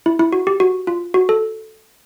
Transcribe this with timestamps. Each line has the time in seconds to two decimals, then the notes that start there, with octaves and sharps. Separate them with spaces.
0.06 E4
0.19 E4
0.33 F#4
0.47 G4
0.60 F#4
0.87 F4
1.14 F#4
1.29 A4